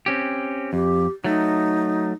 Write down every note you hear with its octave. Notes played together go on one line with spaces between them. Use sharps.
C4 C#4 G4
F2 G4
F#3 A3 D#4